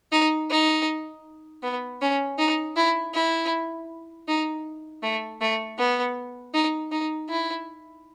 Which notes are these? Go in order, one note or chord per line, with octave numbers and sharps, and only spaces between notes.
D#4
D#4
B3
C#4
D#4
E4
E4
D#4
A3
A3
B3
D#4
D#4
E4